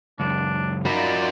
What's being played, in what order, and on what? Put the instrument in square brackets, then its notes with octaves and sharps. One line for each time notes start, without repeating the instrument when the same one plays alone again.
[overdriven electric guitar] C#2 F#2 [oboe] D4
[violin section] D#4 F4 D5 [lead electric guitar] F#4 A#4 [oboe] B5